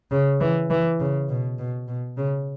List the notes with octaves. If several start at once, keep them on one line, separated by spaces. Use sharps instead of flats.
C#3
E3
E3
C#3
B2
B2
B2
C#3